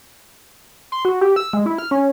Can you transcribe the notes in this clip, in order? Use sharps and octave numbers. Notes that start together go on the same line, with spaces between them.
C6
F#4
G4
E6
G#3
E4
F6
C#4